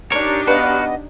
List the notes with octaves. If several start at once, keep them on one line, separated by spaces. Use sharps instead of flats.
D4 D#4 G4 A#4 C#5
B3 F#4 B4 D#5 F5